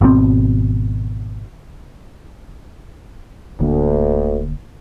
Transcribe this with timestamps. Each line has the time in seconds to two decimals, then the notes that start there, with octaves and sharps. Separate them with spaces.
0.01 G#1 B2 D3 C4
3.59 D1 D2 D3 A#3